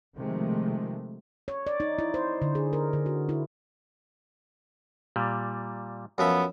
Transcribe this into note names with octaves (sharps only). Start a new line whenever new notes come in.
C3 D#3 F3 G#3 A3
C#5
D5
D#4
E4
C5
D3
G#4
A#4
D3
F#4
E4
A#2 G3
F#2 F3 B3 E5